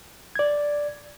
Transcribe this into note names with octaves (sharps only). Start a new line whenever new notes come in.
D5 G#6